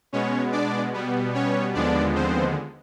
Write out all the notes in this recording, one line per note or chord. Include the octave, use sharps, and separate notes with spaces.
B2 G#3 B3 C#4 C#5
D4 D5
B2 G3 B3
C#4 C#5
D#2 D3 F3 G#3 B3 D4 D5
C4 C5